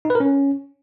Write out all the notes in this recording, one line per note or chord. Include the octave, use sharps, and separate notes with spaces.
D#4
B4
A#4
C#4